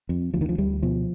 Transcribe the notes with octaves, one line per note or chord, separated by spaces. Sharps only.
F2
D2 F3
D#3
F3
D2 G3
B2 F3